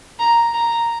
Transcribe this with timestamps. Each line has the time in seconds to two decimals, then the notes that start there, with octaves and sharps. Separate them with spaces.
0.20 A#5
0.54 A#5